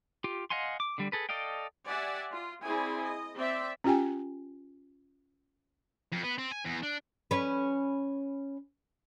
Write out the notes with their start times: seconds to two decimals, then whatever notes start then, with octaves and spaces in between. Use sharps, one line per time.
0.24 F4 G4
0.50 D#5 F5 F#5 G#5 C6
0.80 D6
0.98 D3 G3
1.12 G#4 A4 B4
1.29 A4 D5 D#5 F5 G5
1.86 G4 D5 E5 F#5 G#5
2.32 F4
2.62 C4 E4 G#4 D5 G#5
3.01 D#5
3.36 C4 D5 E5
3.84 C#4 F4 G4 G5 G#5
6.12 F2
6.24 B3
6.38 C4
6.52 G#5
6.65 E2
6.83 D4
7.31 C#4 B4